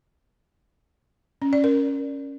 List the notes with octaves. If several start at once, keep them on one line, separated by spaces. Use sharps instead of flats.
C#4
D5
A#4